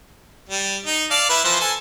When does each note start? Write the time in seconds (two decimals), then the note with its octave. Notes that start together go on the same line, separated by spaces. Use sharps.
0.49 G3
0.86 D#4
1.11 D5 F5 A5
1.29 E4 B4
1.44 E3 F3 C5
1.60 A4 G#5